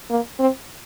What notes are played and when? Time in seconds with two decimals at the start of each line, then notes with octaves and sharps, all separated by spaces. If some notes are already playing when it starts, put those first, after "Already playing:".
0.10 A#3
0.39 C4